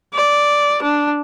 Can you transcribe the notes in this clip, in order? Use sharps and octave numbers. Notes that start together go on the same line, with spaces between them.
D5
D4